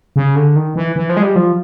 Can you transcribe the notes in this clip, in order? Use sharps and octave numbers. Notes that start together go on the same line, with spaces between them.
C#3
D3
D#3
E3
E3
F3
G#3
G3
F3